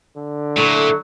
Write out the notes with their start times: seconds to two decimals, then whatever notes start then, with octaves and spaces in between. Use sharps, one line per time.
0.17 D3
0.57 A#2 F#3 A3 E4